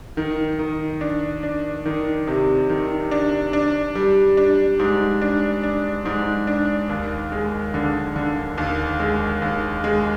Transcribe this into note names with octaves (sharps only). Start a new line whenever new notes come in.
D#3
D#3
D4
D4
D#3
C3
D#3
D4
D4
G3
D4
G#2
D4
D4
G#2
D4
D#2
G#3
D3
D3
D#2
G#3
D#2
G#3